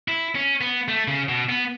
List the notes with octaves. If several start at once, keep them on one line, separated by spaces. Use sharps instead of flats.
E4
C#4
B3
A3
C#3
B2
B3